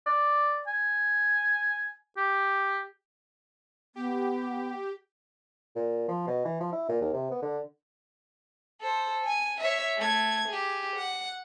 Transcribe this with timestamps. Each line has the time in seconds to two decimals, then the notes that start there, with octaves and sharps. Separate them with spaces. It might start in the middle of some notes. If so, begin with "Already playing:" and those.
0.06 D5
0.68 G#5
2.17 G4
3.96 B3 G4
5.76 A#2
6.08 F3
6.27 B2
6.45 E3
6.60 F3
6.73 E4
6.89 A#2
7.01 D#2
7.14 C3
7.31 B3
7.42 D3
8.81 A4 C5
9.25 G#5
9.61 C#5 E5
9.97 A3 G#6
10.48 G4 G#4
10.96 F#5